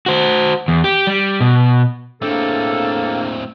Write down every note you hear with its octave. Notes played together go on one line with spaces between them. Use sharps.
F#4 C5
E2
G4
G3
B2
A2 A#3 C4 D4 G#4 A4